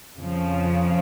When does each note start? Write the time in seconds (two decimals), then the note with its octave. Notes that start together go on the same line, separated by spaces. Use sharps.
0.17 F2 C#3 F3